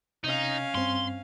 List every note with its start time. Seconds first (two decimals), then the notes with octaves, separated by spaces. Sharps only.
0.24 C3 C#4 D#4 D#5 F5
0.75 G2 C4 C6